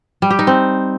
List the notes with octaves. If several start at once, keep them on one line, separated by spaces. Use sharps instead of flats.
G3
G4
D#4
C4